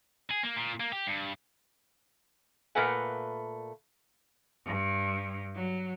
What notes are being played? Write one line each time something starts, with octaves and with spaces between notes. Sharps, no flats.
G#4
A#3
A#2
A#3
G4
G2
A#2 A3 A#4 B4 F#5 G#5
G2
F#3